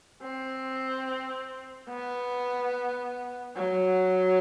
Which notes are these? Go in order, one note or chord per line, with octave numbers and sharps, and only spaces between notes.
C4
B3
F#3